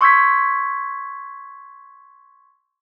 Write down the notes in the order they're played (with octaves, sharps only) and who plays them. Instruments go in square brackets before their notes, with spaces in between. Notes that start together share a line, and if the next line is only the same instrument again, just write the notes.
[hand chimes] C6 C#6 E6 G6 G#6 B6